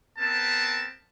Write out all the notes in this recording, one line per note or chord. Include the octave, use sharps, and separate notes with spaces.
B3 C4 A#4 A5